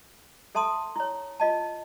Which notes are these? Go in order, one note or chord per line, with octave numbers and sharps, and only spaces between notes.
A4 E5 A5 C6 D#6
E4 C#5
F4 D#5 A5